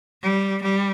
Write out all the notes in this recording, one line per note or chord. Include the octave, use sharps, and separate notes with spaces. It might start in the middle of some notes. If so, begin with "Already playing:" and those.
G3
G3